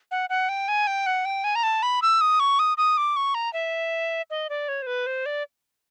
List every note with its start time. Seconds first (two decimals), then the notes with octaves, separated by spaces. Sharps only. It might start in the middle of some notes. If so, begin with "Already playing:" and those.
0.11 F#5
0.30 F#5
0.49 G5
0.68 G#5
0.87 G5
1.06 F#5
1.25 G5
1.44 G#5
1.55 A#5
1.63 A5
1.83 B5
2.02 E6
2.21 D#6
2.40 C#6
2.59 D#6
2.78 D#6
2.97 D6
3.16 C#6
3.35 A#5
3.53 E5
4.30 D#5
4.50 D5
4.68 C#5
4.82 C5
4.87 B4
5.07 C5
5.26 D5